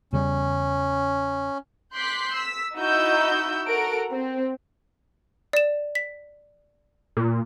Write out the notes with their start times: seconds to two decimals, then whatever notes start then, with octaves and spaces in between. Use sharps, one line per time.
0.13 E2 C#3 G3 C#4
1.94 C6 D6 F#6 G6 B6 C7
2.33 E6 B6
2.75 D#4 E4 F#4 E6 G6
3.66 F#4 A4 A#4 F#5 A#5 D7
4.10 C4
5.53 D5 E7
5.95 B6
7.17 A#2